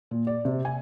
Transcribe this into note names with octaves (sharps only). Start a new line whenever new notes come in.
A#2
D5
C3
G#5